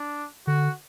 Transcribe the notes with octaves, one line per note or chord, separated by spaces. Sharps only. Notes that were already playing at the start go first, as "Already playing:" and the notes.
Already playing: D4
D3 F#4